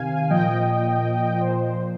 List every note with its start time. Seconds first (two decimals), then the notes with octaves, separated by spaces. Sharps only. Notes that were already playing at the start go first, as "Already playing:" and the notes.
Already playing: C3 D#3 F5 G#5
0.30 A#2 F3 D#5 G5
1.41 A#2 F3 C5